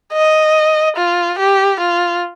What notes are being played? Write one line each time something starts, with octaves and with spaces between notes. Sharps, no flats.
D#5
F4
G4
F4